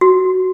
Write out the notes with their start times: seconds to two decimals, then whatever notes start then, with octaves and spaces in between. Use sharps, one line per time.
0.01 F#4